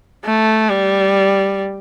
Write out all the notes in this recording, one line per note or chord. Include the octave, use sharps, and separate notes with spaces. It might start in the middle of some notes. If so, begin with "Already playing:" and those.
A3
G3